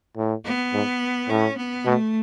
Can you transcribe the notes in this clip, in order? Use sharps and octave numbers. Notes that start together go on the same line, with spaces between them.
A2
B3
G#2
A2 C#4
B3
B2 A3